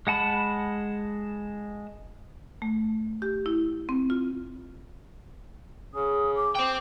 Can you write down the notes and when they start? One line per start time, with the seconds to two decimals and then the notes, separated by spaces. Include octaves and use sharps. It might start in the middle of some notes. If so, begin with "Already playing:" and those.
0.07 G#3 F#5 A5 B5
2.62 A3
3.22 G4
3.46 E4
3.89 C4
4.10 F4
5.94 C#3 D#6
6.36 D6
6.56 C5 G5